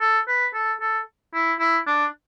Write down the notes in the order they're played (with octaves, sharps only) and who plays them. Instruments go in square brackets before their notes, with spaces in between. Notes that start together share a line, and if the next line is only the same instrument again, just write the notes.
[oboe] A4
B4
A4
A4
E4
E4
D4